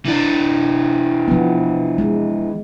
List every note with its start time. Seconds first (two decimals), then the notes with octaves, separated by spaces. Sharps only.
0.05 E3 D4
1.28 F3 B3
1.98 G#3